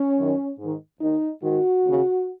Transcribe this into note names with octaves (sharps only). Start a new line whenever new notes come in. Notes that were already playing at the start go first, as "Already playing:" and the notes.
Already playing: C#4
F#2 D#3
G#2 D#3
D#2 D#3 D#4
G#2 D#3 F#4
D#2
C#3